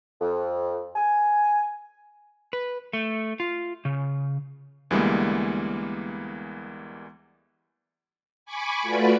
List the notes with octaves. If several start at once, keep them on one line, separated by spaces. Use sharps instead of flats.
F2
G#5
B4
A3
F4
C#3
D2 E3 G3 G#3 A#3 B3
G#5 B5 C#6 D6
A3 F4 F#4 B4 D5